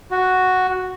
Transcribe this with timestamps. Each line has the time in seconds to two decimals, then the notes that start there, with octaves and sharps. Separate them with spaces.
0.11 F#4